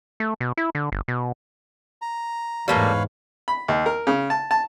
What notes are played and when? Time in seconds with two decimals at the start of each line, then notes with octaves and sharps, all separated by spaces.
0.20 A3
0.40 B2
0.57 E4
0.75 D3
0.92 G1
1.08 B2
2.02 A#5
2.68 E2 G#2 G3 A3 A#3 B4 C#5 F5
3.48 B5
3.68 D#2
3.86 A#4
4.07 C#3
4.30 A5
4.51 A5